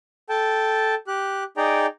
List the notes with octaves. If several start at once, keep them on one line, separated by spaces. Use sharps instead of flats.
A4 G5 A5
G4 F#6
D#4 G#4 D5 G5 A#5